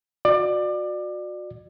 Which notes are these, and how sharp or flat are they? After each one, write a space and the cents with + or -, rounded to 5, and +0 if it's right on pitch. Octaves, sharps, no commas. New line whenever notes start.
F#4 -30 D5 +25